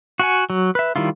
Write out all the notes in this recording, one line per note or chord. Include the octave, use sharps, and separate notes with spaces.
F#4 F#5 G#5
F#3
B4 E5
D#3 G3 E4 F4